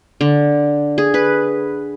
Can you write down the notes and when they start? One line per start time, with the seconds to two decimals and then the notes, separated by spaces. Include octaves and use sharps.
0.21 D3
0.98 G#4
1.14 B4